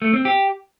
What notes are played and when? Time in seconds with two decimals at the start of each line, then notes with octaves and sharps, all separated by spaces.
0.02 A3
0.13 C4
0.25 G4